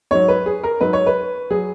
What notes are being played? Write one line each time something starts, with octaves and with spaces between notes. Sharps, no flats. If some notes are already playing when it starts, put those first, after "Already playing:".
G#2 F#3 C#5
B4
G#4
A#4
G#2 F#3 B4
C#5
B4
F#3 G#4